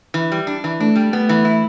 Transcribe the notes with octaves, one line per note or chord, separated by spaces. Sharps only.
E3
G3
D4
E3
A3 D4
G3
A3 B3
E3
E4